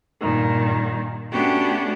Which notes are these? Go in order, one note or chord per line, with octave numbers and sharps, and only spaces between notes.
G2 A#2 D#3
A3 B3 C#4 D4 F#4 G4